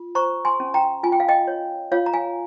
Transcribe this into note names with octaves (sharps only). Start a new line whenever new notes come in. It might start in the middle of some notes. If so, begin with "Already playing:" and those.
Already playing: F4
C5 A#5 C#6
G#5 C6
C#4
G5 A#5
F4 G#5
G5
F5
D#5 G5
C#5
F4 C#5 F5
A#5
F5 G#5